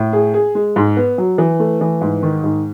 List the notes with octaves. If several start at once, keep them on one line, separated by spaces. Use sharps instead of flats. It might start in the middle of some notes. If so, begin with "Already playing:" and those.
Already playing: A2
G#4
G#4
G#3
G#2
B3
F#3
E3
A3
E3
G#2
D#3
G#2